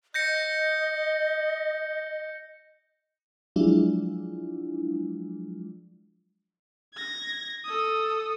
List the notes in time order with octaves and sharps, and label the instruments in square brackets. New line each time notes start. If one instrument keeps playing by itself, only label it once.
[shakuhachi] D#5 [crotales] G6 A#6 C#7
[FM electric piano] F3 F#3 G#3 D4 E4 F4
[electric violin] G#6 A#6
A4 D#6